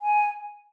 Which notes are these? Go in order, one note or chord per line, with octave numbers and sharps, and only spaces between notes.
G#5